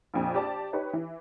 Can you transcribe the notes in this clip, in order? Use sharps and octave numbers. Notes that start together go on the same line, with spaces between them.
A#1 F2 A#2
G4 D5 A5
D#4 G4 B4 C#5
E3